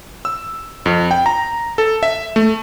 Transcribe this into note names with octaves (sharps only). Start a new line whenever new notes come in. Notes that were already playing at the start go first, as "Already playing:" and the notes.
E6
F2
G5
A#5
A4
E5
A3